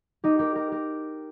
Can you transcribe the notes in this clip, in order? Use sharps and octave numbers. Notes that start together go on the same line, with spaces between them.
D#4 G4
G4 A#4
G4 A#4
G4 A#4